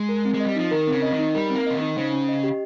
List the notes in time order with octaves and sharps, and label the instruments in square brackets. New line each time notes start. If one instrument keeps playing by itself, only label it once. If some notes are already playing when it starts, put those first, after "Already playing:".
Already playing: [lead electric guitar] G#3
[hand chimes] A#4
C4
[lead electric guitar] G#3
[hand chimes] D#5
[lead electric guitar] G3
[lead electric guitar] F3 [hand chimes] D#4
[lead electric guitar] D#3 [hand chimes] A#4
[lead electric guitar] C#3 [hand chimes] C4
[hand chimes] D#5
[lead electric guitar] D#3
[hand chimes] D#4
[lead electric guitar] G3 [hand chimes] A#4
[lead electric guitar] A#3 [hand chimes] C4
[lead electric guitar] C#3 [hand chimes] D#5
[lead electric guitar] D#3 [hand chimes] D#4
[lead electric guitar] C#3 [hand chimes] C5
[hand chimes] C#4
D#5
G4